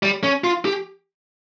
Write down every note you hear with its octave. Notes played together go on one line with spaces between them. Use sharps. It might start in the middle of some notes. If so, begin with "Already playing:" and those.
G3
C#4
F4
G4